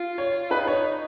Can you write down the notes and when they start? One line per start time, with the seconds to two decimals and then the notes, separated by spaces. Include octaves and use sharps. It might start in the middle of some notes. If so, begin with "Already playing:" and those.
Already playing: F4
0.18 C#5
0.51 D#4 B4
0.67 C#5